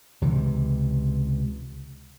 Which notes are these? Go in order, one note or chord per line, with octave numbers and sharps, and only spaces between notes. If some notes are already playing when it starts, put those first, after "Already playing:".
C#2 C3 E3